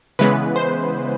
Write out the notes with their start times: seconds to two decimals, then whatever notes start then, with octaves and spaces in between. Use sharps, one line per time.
0.19 C#3 E3 G#3 B3 B4
0.56 C5